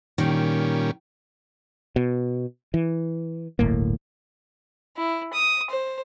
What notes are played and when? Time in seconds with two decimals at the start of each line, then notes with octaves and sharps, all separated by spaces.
0.18 A#2 D#3 G3 C#4
1.96 B2
2.74 E3
3.59 D1 G1 A2 A#3
4.97 E4
5.33 D#6
5.71 C5